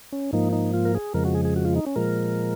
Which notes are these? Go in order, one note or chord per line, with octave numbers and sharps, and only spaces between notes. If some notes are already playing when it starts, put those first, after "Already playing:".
C#4
G#2 F3 A#3 D#4
D#4
F4
A#4
G#4
F2 C#3 F3 G#3 A#4
F#4
G#4
G#4
F#4
F4
D#4
C#4
A#2 F3 G#3 A#4